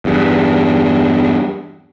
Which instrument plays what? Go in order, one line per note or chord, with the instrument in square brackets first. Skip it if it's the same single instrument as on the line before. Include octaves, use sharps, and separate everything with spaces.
[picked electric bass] E2 G2